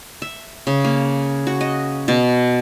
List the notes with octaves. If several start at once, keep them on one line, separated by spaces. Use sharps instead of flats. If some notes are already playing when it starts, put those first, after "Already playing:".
E5
C#3
A#3
F#4
D#5
B2